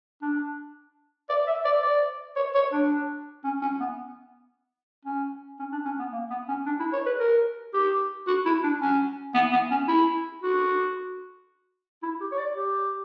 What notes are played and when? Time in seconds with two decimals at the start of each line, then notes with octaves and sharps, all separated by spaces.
0.22 D4
1.29 D5
1.47 E5
1.65 D5
1.83 D5
2.36 C#5
2.55 C#5
2.72 D4
3.44 C#4
3.62 C#4
3.80 B3
5.05 C#4
5.59 C#4
5.72 D4
5.85 C#4
5.99 B3
6.13 A#3
6.30 B3
6.48 C#4
6.66 D4
6.79 E4
6.93 C#5
7.06 B4
7.19 A#4
7.74 G4
8.27 F#4
8.46 E4
8.63 D4
8.81 C#4
9.34 B3
9.52 B3
9.71 C#4
9.88 E4
10.42 F#4
12.03 E4
12.21 G4
12.32 C#5
12.39 D5
12.56 G4